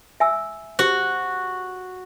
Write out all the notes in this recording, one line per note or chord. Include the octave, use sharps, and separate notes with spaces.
E5 G#5 E6
F#4 G4 C5